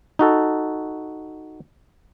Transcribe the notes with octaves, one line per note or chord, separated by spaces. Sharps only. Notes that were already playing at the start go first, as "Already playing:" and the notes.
D#4 F#4 A4